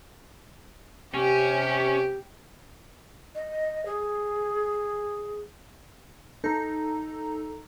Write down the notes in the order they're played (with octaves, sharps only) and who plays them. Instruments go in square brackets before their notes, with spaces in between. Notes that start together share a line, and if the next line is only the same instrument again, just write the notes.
[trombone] C3 [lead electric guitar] C#4 [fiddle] G4
[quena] D#5
G#4
[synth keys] D#4 [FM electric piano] A4 A#5